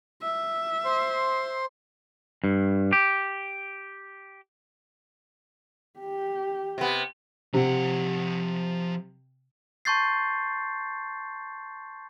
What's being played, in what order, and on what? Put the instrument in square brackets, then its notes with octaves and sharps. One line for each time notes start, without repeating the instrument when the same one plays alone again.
[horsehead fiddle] E5
[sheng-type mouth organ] C5 C6
[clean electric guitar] G2
G4
[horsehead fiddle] G4
[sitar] C3 B3
[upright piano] C3 [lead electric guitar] F3 F#5
[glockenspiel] A5 C6 C#6 G6 A6 C7